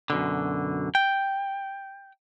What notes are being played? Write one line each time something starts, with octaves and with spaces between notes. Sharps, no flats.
F#2 B2 D3
G5